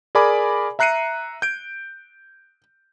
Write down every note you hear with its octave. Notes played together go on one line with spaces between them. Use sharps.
G#4 A#4 D5 G#5 B5 D6
E5 A#5 F#6 C7 C#7 D#7
G6 D7